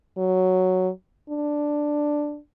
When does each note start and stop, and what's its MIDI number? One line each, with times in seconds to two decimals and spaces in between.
0.18 0.90 54
1.29 2.39 62